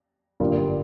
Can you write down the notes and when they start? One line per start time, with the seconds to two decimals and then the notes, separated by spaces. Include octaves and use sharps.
0.40 G1 G2 G3 A#3 F4